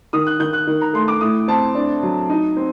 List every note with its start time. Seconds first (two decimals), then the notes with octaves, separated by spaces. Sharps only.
0.13 D#3 D#6
0.27 F#6
0.40 D#3 G6
0.53 F#6
0.67 D#3
0.81 A#5
0.93 A3 C6
1.08 D6
1.21 A2 D#6
1.48 C4 A5
1.75 D4
2.03 F#3
2.29 D#4
2.57 C4